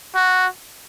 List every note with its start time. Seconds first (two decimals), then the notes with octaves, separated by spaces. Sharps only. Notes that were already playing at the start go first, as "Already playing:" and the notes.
0.15 F#4